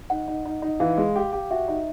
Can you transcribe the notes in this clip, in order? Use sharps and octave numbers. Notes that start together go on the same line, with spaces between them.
D#4 F#5
D#4
D#4
D#4
E3 F5
G#3
G4
G4
F#4 E5
D#4